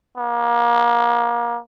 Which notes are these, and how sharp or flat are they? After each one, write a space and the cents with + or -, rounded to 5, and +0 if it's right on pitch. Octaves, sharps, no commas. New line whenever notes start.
A#3 +30